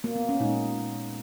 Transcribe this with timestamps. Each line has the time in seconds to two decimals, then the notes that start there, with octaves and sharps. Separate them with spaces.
0.04 A#3
0.16 B3
0.29 C#4
0.40 A#2 G#3 D#4